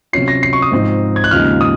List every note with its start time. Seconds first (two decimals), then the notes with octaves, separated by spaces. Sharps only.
0.13 C3 F#3 C#4 F4 C7
0.28 A#6
0.43 C7
0.53 C#6
0.62 D#6
0.72 G#2 F3 C4 D#4
1.16 G#6
1.24 F#6
1.31 D#2 C#3 F3 G#3 D#4 F6
1.61 D#6